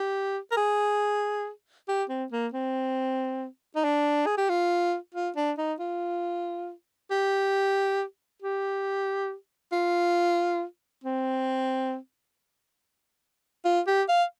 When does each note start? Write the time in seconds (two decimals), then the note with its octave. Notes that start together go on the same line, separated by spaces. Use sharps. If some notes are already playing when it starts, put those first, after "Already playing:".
Already playing: G4
0.52 A#4
0.57 G#4
1.89 G4
2.09 C4
2.32 A#3
2.54 C4
3.76 D#4
3.84 D4
4.26 G#4
4.38 G4
4.49 F4
5.14 F4
5.37 D4
5.58 D#4
5.80 F4
7.11 G4
8.42 G4
9.72 F4
11.04 C4
13.65 F4
13.87 G4
14.08 F5